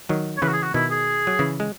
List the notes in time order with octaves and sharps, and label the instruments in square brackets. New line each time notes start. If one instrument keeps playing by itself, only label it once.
[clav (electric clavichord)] D#3 F#3
[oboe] C#5
[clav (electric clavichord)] C#3 E3 [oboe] B4
[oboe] F#4
G#4
F#4
[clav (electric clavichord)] B2 D#3 [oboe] E4
[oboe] G#4
[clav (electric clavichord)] F#3
C#3 E3
G#3